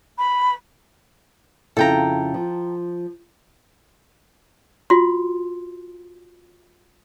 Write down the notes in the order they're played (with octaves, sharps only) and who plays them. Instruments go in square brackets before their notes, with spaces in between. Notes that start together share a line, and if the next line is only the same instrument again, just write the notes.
[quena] B5
[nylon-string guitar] F2 C#3 E4 [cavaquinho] A4 G5 A#5
[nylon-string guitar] F3
[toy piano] F4 F#4 C6